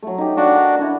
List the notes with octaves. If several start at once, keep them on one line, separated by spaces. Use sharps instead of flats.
F#3 A3
D#4 G4
D4 F#4 D5 F5
A#4 D#5 F#5
D4 E4